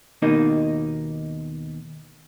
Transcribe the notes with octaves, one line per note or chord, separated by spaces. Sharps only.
D#2 B2 A#3 D#4 D#5